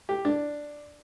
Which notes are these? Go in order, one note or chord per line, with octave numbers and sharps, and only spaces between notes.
G4
D4